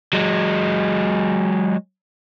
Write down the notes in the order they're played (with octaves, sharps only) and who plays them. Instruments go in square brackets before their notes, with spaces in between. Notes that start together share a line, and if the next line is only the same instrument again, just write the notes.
[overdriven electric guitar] F#3 G#3